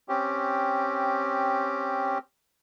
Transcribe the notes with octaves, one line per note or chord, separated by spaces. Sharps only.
C4 C#4 G4